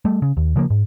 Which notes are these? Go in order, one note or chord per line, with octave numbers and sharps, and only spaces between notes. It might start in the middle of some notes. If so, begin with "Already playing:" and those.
G3 A3
C#3
D#2
C#3 F3 G#3 A#3
G#2